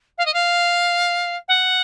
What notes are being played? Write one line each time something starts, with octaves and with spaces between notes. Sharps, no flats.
F5
D#5
F5
F#5